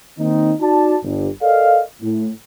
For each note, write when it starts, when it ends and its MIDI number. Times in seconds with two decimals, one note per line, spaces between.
0.19 0.53 51
0.19 0.53 58
0.19 0.53 60
0.19 0.53 63
0.61 0.96 63
0.61 0.96 66
0.61 0.96 74
0.61 0.96 81
1.04 1.29 31
1.04 1.29 43
1.42 1.82 69
1.42 1.82 70
1.42 1.82 74
1.42 1.82 75
1.42 1.82 77
2.02 2.30 45